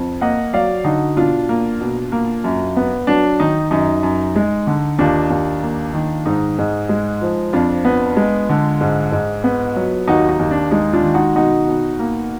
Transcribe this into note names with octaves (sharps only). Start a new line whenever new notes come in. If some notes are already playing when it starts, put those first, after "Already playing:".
Already playing: F2
A#3 D#5 F#5
F#3 D5 F5
D3 D#4 F#4
B2 D4 F4
A#3
B2
A#3
F#2
B3
F#3 D4
D#3 D#4
F#2 D#4
F#2
G#3
D3
D#2 D4 F4
D#2
A#3
D#3
G#2 D#4
G#2
G#3
F3
F2 D4 F4
B3
G#3
D3
G#2
G#2
B3
F#3
D#2 D#4 F#4
D#4
D#2
D4
G#3 D#4
D4 F4
D#3
D#4 F#4
B2 D#4 F#4
B2
A#3